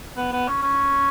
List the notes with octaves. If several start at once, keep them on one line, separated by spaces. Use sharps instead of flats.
B3
B3
C#4
C#4